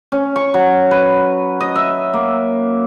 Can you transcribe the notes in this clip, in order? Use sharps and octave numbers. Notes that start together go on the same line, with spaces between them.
C#4
C#6
F#3
B4
D#5
E5
A#3